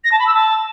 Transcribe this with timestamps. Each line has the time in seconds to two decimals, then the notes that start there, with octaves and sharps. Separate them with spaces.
0.04 A#6
0.11 A5
0.19 B5
0.26 E6
0.34 A5